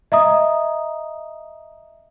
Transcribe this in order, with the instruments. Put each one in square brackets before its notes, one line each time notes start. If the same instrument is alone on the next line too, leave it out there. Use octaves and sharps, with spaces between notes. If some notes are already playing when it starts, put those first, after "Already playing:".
[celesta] D#5 E5 A#5 D#6